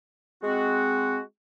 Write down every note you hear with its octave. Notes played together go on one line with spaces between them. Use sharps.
G#3 C4 F#4